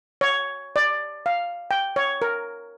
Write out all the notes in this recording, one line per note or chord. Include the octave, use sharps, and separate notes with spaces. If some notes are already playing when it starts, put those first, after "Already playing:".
C#5
D5
F5
G5
C#5
A#4